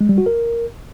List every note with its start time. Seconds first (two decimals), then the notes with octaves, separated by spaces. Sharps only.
0.01 G#3
0.09 G3
0.18 F#4
0.26 A#4